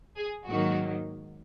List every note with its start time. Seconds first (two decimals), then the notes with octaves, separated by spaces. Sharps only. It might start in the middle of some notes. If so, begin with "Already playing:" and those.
0.17 G#4
0.48 G#1 G#2 D#3 F#3 A#3 F#4